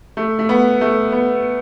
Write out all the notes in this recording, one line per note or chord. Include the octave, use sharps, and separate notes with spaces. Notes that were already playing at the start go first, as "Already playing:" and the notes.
A3
A3
B3
A3
B3